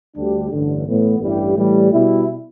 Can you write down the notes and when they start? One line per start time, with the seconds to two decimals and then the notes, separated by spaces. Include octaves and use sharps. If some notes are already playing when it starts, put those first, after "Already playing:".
0.16 D2 D3 G3 D4 G4
0.51 A1 G2 D3
0.87 A2 E3 B3
1.21 A1 G2 G3 E4 G4
1.56 A2 E3 G3
1.91 B2 G3 E4